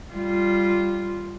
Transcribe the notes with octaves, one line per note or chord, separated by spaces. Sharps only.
G3 F4